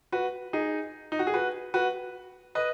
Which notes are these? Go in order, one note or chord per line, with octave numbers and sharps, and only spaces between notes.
F#4 B4
D#4 G#4
D#4
F#4
G#4
F#4 B4
F#4 B4
B4 D#5